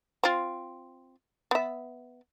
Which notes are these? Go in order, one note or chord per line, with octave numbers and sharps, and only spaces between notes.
C4 F4
B3 E5